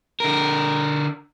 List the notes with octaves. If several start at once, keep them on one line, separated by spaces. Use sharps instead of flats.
D3 A#4